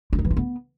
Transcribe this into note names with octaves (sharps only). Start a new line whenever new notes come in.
F4
D#4
E3
F4
B3